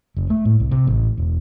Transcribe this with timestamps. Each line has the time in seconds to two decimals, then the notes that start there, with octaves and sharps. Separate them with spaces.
0.17 F#1
0.30 A3
0.45 A2
0.60 C2
0.71 C3
0.87 A1
1.18 E1